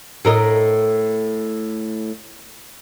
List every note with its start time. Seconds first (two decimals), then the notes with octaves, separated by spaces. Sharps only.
0.25 A2 A#4 D#5